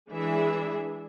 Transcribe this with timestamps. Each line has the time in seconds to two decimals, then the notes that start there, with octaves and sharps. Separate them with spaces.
0.11 E3 G#3 D4 G#4 E5